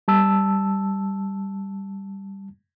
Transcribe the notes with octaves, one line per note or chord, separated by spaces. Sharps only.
G3 A5 E6